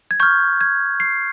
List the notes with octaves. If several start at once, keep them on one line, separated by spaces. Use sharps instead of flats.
G#6
C#6 F6 G6
G#6
C7